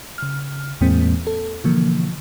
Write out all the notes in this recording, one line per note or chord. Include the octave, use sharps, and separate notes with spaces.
C#3 F6
E2 A2 E3 G#3 A#3 C4
A4
B2 D3 E3 F3 A#3